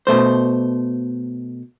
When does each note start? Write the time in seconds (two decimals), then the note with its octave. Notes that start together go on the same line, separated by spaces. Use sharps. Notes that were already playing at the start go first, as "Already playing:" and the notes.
0.07 B2 A3 C5